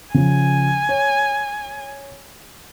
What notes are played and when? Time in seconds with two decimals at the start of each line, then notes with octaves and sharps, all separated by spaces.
0.14 C#3 F3 G#5
0.89 C#5